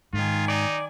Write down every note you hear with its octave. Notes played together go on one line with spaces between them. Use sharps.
G#2 D#3 F4 G#5
D#4 D5